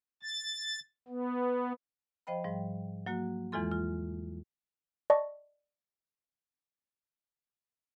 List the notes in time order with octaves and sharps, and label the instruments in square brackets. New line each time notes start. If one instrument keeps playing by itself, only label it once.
[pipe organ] A6
B3
[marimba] F3 C5 D#5 G5 B5
G#2 F3 G3
F#3 A#3 F#4
E2 E3 G#3 F4 A4 C6
F4
[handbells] D5 D#5 A5 C#6